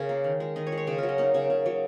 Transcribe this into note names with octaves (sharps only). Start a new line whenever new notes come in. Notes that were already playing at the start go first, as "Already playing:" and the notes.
Already playing: C#3 G#4 A#4
A#3
D#3
G#3
D#3 D#5
C#5
G#3
C#5
C#3 D#5
F#3 A#4
D#5
A#3 D#4
C#3
C#3
F#3